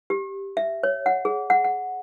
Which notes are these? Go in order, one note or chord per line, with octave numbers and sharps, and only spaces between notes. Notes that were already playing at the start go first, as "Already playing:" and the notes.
G4
E5
C#5
F#5
G#4
F#5
F#5